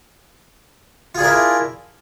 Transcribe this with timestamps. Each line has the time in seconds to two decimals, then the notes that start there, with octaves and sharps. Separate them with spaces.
1.15 F4
1.18 G#4
1.20 D4
1.23 A#4
1.26 E4